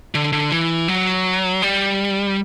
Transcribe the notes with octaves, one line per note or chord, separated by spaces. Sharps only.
D3
D3
E3
F#3
G3